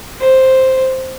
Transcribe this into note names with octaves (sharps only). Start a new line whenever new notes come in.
C5